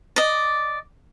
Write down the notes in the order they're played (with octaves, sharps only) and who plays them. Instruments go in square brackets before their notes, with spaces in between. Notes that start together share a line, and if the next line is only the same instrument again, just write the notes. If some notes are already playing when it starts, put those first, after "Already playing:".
[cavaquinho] D5 D#5